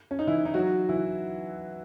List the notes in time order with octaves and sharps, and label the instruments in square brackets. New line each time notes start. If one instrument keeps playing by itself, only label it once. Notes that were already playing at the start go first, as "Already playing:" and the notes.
[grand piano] C#4
D#4
E3 E4
D#4
F#3 F#4
E3 E4